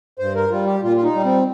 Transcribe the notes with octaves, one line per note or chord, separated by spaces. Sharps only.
G2 C5
A#4
G3 F4
G4
A#2 F4
F4
D#4
G3
C4